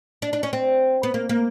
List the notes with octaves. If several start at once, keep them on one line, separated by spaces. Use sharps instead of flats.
D4
D4
C#4
C4
B3
A#3
A#3